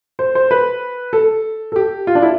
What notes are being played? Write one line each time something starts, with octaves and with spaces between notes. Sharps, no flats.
C5
C5
B4
A4
A4
G4
F4
D4
E4